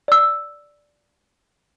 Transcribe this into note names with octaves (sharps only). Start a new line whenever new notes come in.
D5 E6